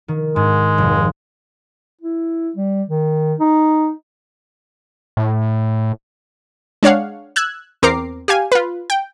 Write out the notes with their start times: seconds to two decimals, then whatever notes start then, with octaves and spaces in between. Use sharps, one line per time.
0.08 D#3
0.36 G#2 G#3
0.78 F1
2.01 E4
2.56 G3
2.89 D#3
3.40 D#4
5.17 A2
6.83 G#3 D4 C#5 F5 F#5
7.36 E6 F#6 G#6
7.82 E2 C4 A#4 A#5 D6 C7
8.28 G4 F5 G#5
8.52 F4 B4
8.90 G5